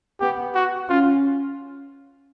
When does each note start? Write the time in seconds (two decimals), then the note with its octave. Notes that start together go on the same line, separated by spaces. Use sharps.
0.20 B3 G4
0.55 F#4
0.89 C#4 F4